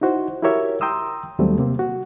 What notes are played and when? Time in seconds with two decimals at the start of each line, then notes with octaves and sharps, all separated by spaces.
0.01 D#4 E4 F#4 C5
0.42 E4 F#4 G4 A#4 C#5 E5
0.81 G5 A#5 C6 D#6 E6
1.39 D#2 F#3 G3 A3 C4
1.58 C3 A#3 C4
1.79 F#4